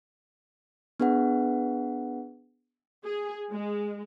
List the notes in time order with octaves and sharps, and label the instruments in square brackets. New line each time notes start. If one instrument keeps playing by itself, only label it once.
[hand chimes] B3 D4 G#4 B4 F#5
[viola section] G#4
G#3